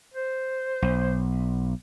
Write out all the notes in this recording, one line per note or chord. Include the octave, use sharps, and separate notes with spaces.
C5
B1